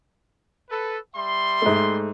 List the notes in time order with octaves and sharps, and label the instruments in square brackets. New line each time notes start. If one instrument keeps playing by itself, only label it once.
[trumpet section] A4 B4
G3 E5 C6
[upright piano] G#2 A3